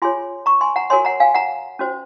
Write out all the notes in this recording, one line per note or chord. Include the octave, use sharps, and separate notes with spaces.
F4 G#4 C#5 G#5 C6
A#5 C#6
G#5 C6
F#5 A#5
F#4 A#4 C#5 G#5 C6
F#5 A#5
F5 G#5
F#5 A#5
C#4 F#4 C5